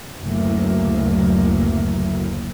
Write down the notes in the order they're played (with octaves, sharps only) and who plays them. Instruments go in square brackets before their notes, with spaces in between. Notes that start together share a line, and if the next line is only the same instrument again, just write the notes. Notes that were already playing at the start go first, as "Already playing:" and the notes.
[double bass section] F#1 D2 A2 F#3 A#3